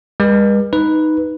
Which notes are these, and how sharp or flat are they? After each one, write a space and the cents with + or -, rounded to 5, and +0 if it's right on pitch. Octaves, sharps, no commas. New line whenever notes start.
G#3 -40 B4 -40
D#4 +0 B4 +0